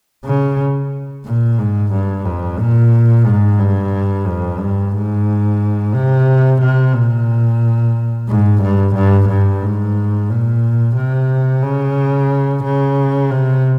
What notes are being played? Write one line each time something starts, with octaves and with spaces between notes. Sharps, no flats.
C#3
A#2
G#2
G2
F2
A#2
G#2
G2
F2
G2
G#2
C3
C3
A#2
G#2
G2
G2
G2
G#2
A#2
C3
C#3
C#3
C3